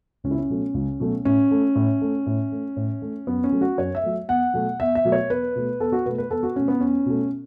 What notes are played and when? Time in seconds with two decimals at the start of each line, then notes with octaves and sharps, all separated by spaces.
0.24 C#2 C#4
0.31 E4
0.38 C#4
0.49 B2 F#3 A3
0.74 C#2
1.00 B2 F#3 A3
1.25 A2 C#4
1.51 A3
1.75 A2
2.01 A3
2.26 A2
2.52 A3
2.76 A2
3.02 A3
3.27 F#2 B3
3.44 C#4
3.52 F#3 A3
3.61 F#4
3.78 F#2 C#5
3.95 E5
4.03 F#3 A3
4.28 E2 F#5
4.54 B2 F#3 A3
4.80 E2 E5
4.95 E5
5.04 B2 F#3 A3
5.12 C#5
5.30 E2 B4
5.56 B2 A3
5.80 E2 A4
5.92 F#4
6.06 B2 A3 B4
6.18 B4
6.30 E2 A4
6.43 F#4
6.55 B2 A3 C#4
6.68 B3
6.81 E2 C#4
7.06 B2 A3